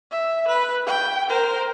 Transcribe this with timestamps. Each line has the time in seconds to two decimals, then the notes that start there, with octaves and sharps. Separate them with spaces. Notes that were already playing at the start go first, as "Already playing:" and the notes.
0.11 E5
0.48 B4
0.86 G5
1.28 A#4 C5